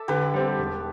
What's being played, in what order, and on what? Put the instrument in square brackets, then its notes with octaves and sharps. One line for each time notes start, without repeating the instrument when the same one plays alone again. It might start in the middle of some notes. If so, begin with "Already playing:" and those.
Already playing: [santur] A4 D5 E5
[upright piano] D3 [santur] G4 B4
[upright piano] G3 C4
E1